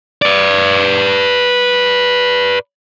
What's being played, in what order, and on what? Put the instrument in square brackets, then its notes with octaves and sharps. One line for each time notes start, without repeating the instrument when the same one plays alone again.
[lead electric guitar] B4 D5